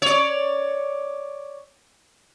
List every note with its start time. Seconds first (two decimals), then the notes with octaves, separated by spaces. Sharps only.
0.02 C#5 D5